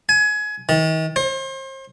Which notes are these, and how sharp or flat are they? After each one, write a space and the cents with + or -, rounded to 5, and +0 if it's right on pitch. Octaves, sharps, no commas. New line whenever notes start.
G#5 +25
D#3 +40
C5 +35